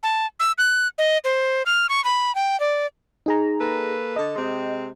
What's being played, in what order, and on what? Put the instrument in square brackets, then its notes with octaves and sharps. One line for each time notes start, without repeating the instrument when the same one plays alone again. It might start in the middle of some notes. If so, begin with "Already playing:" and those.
[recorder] A5
E6
F#6
D#5
C5
F6
C#6
B5
G5
D5
[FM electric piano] D#4 G#4 A#5
[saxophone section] A#3 A4 B4
[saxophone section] D3 A4 [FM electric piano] D#5
[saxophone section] C3 G#3 C4